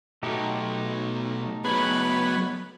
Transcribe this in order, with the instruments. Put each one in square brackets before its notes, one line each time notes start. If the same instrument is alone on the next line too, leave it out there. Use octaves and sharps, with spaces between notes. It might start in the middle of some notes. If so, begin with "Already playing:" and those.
[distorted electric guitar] B2 F#3 [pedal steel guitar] A3 D#4 G4
[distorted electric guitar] F#3 G#4 [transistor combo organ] B3 [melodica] B4 C#5 B5